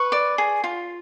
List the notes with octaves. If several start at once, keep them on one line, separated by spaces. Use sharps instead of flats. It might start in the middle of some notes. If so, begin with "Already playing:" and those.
Already playing: B4 C#6
D5
G#4
F4